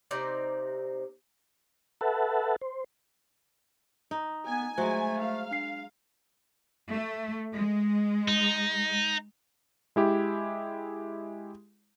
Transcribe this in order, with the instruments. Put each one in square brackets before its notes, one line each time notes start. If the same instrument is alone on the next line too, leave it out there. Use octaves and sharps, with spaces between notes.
[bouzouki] C3 C4 D#4 D5
[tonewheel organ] A4 B4 E5 F#5 A5
C5
[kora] D#4
[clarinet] B3 [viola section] G#5
[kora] F#3 G#3 [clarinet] A3 [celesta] C5
[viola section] F5
[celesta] D4 C7
[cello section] A3
G#3
[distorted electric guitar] D#4
[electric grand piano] G#3 E4 G4